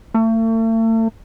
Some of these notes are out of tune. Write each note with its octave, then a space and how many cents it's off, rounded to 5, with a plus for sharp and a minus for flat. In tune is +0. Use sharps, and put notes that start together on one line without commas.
A3 +40